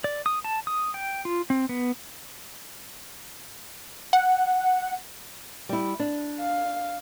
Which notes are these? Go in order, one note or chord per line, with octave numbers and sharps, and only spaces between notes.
D5
D#6
A5
D#6
G5
F4
C4
B3
F#5
G3 E4
D4
F5